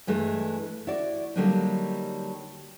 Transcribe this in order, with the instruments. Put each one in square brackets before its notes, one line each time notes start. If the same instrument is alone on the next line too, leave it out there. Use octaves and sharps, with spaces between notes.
[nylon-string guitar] G2 E3 G#3 A3
E4 F#4 D5
D3 F#3 G3 A#3 D4 D#4